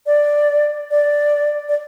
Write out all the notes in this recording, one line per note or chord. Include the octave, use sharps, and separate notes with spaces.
D5
D5
D5